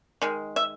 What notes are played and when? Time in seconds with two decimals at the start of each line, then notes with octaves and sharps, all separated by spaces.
0.22 D#3 G#3
0.56 E5